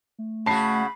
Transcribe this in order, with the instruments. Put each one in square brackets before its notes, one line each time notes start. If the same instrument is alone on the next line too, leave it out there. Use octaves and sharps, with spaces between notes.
[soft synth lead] A3
[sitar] C#3 F#4 [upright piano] A5 C7 [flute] B5